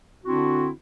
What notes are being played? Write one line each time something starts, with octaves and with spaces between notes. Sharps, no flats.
D3 C4 D4 E4 F#4